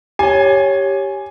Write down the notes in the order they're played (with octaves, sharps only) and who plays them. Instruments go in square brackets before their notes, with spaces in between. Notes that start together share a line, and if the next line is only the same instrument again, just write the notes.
[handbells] G4 C#5 [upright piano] G#5